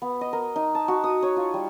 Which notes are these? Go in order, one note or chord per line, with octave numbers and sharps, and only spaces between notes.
B3
D#5
A#4
D#4
A5
F#4
D#6
C#5
F4
G3